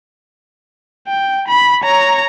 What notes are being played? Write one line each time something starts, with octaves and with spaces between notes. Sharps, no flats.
G5
B5
C#5 A#5